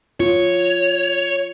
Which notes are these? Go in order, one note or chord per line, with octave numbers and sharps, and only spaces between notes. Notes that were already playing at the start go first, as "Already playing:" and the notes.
F4 C#5